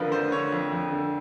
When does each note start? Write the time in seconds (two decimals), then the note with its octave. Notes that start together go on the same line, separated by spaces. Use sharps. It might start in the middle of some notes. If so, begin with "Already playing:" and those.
Already playing: F2 D3 F3 A#4 B4
0.12 D3 C5
0.32 D3 C#5
0.52 F2
0.72 F2
0.91 D3